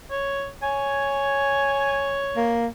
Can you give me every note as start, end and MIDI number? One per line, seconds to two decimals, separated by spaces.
0.11 0.49 73
0.63 2.60 73
0.63 2.15 80
2.36 2.67 58